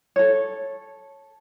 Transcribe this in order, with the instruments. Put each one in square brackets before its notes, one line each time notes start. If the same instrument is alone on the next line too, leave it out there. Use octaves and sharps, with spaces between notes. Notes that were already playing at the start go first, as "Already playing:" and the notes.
[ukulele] A4 C#5